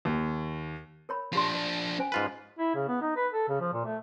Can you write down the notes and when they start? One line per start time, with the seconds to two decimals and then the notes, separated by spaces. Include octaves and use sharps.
0.05 D#2
1.09 A#4 C#5 B5
1.33 F3 D4 F4 G4 C6
1.54 D5
1.98 C#4 C5 G#5
2.12 G#2 F4 B4
2.59 E4
2.75 C#3
2.88 B3
3.01 D#4
3.17 B4
3.32 A4
3.49 C#3
3.61 F3
3.73 A#2
3.85 A3